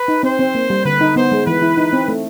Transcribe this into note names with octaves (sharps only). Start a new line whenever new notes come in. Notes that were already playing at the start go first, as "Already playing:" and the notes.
Already playing: B4
D#4
C4 C5
C4
A#3
G3
D3 B4
D#4
B3 C5
G#3
E3 B4
E4
D#4
C4
A3